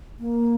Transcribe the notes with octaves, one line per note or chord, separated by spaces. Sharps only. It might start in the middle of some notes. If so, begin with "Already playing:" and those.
A#3